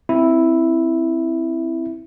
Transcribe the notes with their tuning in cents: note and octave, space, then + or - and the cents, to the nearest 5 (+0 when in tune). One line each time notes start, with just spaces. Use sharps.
C4 +0 E4 +0